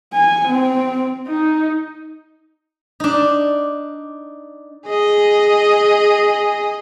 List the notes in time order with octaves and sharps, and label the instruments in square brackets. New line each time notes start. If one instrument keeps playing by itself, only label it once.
[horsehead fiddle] G#5
C4
D#4
[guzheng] D4 D#4
[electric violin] G#4 D#5